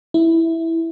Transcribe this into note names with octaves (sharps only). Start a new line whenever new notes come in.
E4